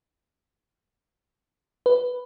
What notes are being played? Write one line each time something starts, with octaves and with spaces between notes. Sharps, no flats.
B4